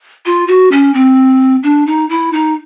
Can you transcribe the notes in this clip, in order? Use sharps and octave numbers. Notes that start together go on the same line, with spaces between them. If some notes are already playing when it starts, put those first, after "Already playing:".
F4
F#4
C#4
C4
D4
D#4
E4
D#4